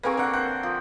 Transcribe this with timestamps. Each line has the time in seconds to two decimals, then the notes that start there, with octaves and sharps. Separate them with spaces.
0.03 A#3 C4 G#4 A#4 B4 C#6
0.17 D3 A#4 F#5
0.33 C5 F#5 F#6
0.63 F3